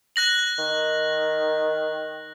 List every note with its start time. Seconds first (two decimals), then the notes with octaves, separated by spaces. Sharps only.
0.16 F#6 A#6 F#7
0.59 D#3